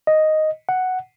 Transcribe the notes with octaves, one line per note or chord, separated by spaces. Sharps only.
D#5
F#5